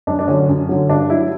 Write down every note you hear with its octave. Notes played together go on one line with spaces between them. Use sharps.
F#2 D4
D4
D3 F#3 C#4
F#2
D3 F#3
G2 D4
F#3 E4